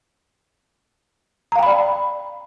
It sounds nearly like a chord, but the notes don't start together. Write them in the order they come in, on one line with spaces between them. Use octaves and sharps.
A#5 F5 G5 B5 D5